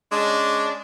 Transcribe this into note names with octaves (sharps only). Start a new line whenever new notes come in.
G#3 C#4 D4